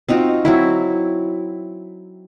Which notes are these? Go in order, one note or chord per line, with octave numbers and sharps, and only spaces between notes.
C4 D#4 F4 F#4
F#3 C4 E4